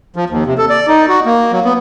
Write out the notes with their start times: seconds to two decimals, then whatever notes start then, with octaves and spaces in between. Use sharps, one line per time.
0.16 F3
0.30 D#2
0.46 C3
0.58 A4
0.70 D5
0.88 D#4
1.09 F#4
1.25 A#3
1.52 F#3
1.65 B3